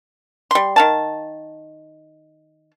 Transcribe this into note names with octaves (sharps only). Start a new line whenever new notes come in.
G3 C6
D#3 F5 A5